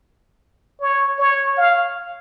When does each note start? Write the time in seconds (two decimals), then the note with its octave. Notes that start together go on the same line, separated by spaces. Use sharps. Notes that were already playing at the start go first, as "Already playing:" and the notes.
0.81 C#5
1.19 C#5
1.58 F5